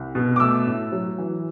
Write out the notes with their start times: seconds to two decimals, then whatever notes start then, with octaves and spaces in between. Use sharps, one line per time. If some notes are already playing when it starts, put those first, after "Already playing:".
Already playing: C2
0.15 B2
0.36 D6
0.40 A3 E6
0.67 A2
0.92 F#3
1.18 E3